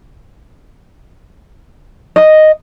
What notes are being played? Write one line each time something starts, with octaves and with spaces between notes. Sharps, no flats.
D#5